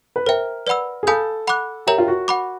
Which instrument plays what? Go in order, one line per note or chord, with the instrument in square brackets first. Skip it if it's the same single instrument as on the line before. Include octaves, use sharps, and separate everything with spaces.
[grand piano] B4
[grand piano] A#4 [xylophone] C5 E5 G5
[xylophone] B4 D5 F#5 B5 E6
[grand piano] G#4
[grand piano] A4 [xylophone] F5 G#5 B5 D#6 G6
[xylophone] F#5 B5 D6 F#6
[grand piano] G4 [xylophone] A#4 C#5 E5 G5 A#5
[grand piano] F4
F#4
[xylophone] F#5 B5 D6